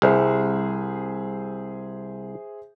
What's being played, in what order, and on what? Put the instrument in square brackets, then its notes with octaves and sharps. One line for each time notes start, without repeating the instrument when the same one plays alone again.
[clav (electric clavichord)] C2 [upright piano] G#4 C5 E5